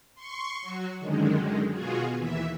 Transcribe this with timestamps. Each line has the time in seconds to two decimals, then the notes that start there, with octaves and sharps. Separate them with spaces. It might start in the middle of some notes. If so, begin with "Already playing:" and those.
0.15 C6 C#6
0.61 F#3 F#4
1.00 F#2 D3 D#3 G#3
1.71 B2 F4 F#4 G#4
2.16 D#2 E3 E5